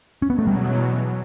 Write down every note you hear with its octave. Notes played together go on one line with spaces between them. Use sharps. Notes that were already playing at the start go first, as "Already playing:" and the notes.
C#4
E2 B2 F#3 B3
A3
G3